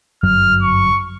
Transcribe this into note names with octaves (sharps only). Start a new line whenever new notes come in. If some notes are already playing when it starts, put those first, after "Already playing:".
G1 F#2 F#3 F6
C#6